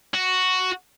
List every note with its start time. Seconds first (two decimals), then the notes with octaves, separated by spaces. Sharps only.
0.14 F#4